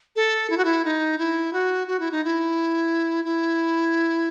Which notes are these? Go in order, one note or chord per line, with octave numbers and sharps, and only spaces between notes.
A4
E4
F#4
E4
D#4
E4
F#4
F#4
E4
D#4
E4
E4